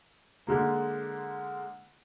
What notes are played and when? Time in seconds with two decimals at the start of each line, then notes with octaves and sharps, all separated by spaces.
0.47 D3 G#3 A#3